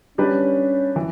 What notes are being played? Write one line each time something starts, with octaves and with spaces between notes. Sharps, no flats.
G3 C#4 D4 G4 B4
E3